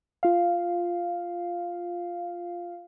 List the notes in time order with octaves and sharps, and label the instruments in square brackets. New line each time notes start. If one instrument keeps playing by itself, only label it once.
[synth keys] F4 F5